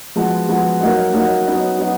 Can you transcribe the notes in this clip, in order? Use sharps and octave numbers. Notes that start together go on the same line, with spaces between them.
F3 G#3 B3 F#4
F3 G#3 B3 F#4
F#3 A#3 D#4 F#4
F#3 A#3 D#4 F#4
F#3 B3 D#4
F#3 B3 D#4